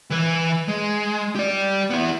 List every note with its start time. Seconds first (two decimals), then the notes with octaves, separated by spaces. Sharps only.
0.10 E3 B4
0.68 G#3
1.36 G4 D5
1.90 B3 E4